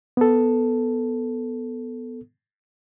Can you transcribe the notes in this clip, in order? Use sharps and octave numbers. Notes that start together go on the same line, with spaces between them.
B3 A4